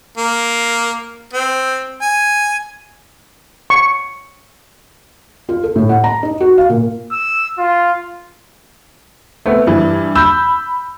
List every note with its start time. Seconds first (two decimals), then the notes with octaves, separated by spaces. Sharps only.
0.17 A#3
1.33 C4
2.02 G#5
3.70 C#6
5.49 F4
5.63 A4
5.76 A2
5.89 F#5
6.04 A#5
6.23 D#4
6.40 F#4
6.58 F5
6.70 A#2
7.12 E6
7.58 F4
9.46 A3 B3 C4
9.67 G2 E3
10.15 B5 E6 G6